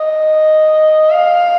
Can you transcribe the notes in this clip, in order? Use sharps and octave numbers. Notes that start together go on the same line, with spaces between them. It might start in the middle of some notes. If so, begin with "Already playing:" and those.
Already playing: D#5
F5